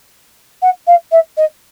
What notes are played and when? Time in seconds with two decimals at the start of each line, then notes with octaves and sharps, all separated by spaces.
0.62 F#5
0.87 F5
1.11 E5
1.37 D#5